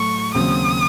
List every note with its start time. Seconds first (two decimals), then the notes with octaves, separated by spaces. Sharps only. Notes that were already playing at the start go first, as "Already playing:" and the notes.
Already playing: A2 F#3 A3 C#6
0.34 D#2 C#3 F#3 C4 D#6